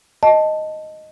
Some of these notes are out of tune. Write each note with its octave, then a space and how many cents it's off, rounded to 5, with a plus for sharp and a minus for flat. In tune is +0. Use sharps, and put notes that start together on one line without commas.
D#5 +0 A5 +0